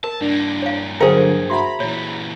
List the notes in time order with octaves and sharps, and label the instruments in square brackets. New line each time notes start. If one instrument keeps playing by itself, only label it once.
[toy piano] A#4 [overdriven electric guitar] A5
[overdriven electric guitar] G2 A#3 [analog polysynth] D4
[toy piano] C#5 F5
[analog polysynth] D3 F#3 [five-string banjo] G#4 A#4 [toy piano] C5 F5 G5
[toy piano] F#4 E5 F#5 [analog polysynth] A#5 B5
[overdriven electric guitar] A#2 E3 [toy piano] C#5